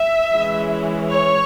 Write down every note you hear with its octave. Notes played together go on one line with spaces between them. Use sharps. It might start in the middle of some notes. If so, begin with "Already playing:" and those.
Already playing: E5
E3 G#3 C#4
C#5